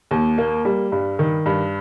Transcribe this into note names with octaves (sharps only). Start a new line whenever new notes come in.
D#2
A#3
G3
G2
D#3
G2